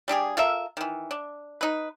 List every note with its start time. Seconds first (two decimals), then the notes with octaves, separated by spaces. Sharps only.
0.08 G3 D4 G4 G#4
0.37 F4 A4 A#4 E5
0.77 D#3 E3
1.11 D4
1.61 D#4 B4